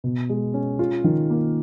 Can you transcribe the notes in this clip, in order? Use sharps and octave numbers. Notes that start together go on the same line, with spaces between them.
B2
G#3
C#4
F4
D#3
A#3